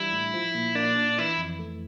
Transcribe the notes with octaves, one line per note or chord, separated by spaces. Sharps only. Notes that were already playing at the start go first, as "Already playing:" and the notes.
Already playing: E3 G3 D4 E4
A2
F3
A#2
A#3 D4
A#2
E3 E4
F2
A3